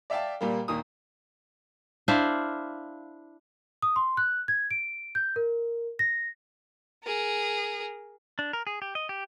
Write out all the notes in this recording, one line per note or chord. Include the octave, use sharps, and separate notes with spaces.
D5 E5 F5 G5 A5
A#2 G3 A#3
D#2 A#2 A#3 D#6
D4 E4 C5 F5
D#6
C6
F#6
G#6
D7
G6
A#4
A#6
G#4 A#4
D4
A#4
G#4
G4
D#5
G4